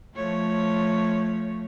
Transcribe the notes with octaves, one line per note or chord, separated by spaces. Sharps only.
F3 A3 C#5